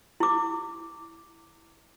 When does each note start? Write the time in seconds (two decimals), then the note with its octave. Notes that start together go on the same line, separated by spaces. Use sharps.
0.20 E4 D6